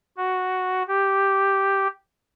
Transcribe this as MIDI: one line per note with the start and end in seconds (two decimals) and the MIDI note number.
0.17 0.83 66
0.88 1.87 67